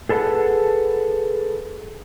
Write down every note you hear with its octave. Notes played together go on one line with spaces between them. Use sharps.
G#4 A4 B4 C#5 F#5 A5